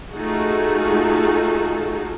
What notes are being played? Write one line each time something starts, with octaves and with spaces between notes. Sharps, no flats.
A3 D#4 F4 F#4 G#4 A4